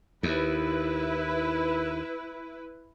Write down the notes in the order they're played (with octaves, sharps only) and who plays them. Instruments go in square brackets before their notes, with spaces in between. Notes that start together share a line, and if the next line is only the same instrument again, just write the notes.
[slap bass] D#2 [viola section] E4 B4